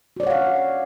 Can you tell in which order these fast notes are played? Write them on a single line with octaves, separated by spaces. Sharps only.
F#4 D5 C#5 F#5 F5